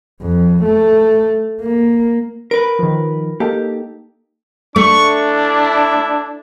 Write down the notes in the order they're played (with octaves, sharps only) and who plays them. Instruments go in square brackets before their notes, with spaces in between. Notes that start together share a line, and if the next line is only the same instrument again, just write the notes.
[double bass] F2
A3
A#3
[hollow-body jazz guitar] A#4 B4 [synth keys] D7
[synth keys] D#3 F3
[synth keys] A#3 D#4 A4 [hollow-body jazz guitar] G4
[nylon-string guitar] A3 [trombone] D4 [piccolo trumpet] C#6
[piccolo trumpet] E4